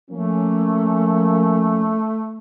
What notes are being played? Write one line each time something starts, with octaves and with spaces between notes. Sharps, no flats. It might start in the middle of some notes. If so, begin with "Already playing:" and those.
F3 A3 A#3 C#4